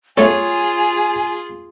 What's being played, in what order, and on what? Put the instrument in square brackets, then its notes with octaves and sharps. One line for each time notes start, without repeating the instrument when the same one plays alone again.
[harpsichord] A3 A4 [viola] F4 G#4 [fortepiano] C#5 [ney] G#5